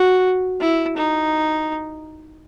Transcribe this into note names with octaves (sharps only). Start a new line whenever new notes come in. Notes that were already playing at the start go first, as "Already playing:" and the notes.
Already playing: F#4
E4
D#4